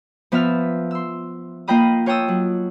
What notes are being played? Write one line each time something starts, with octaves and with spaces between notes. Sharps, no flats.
F3 B3 E5 A5 E6 F6
C6 E6
A#3 F4 D#5 G5 B5 D#6
F4 C#5 G5 A5 D#6 E6
F#3